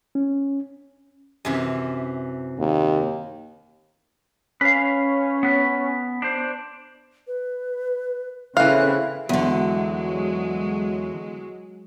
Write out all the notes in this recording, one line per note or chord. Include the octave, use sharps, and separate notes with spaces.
C#4
F#2 C3 E3
D#2
C#4 B4 F5
B3 B4
D4 C5
B4
C#3 E3 C4 E4 A4 F5 F#6
E2 D3 F#3 G#3